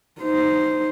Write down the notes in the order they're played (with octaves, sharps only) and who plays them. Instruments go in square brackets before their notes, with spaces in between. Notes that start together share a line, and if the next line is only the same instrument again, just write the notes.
[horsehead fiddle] D#4 C5